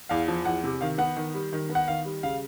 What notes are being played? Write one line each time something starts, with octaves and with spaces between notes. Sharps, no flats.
E2 F5
F3
E2 F#5
C3
D#3 F5
B3 F#5
D#3
G3
D#3
B3
F#5
D#3 F5
G3
C#3 F5